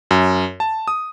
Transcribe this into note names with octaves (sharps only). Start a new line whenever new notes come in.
F#2
A5
D#6